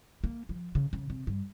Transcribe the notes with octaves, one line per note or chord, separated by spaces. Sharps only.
A#3
F3
C#3
C#3
C3
G2